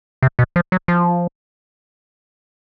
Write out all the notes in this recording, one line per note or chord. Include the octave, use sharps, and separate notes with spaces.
C3
B2
F3
F#3
F3